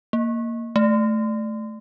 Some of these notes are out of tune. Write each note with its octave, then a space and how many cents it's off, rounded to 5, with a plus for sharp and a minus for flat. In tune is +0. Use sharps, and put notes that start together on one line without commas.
A#3 -10
A3 -10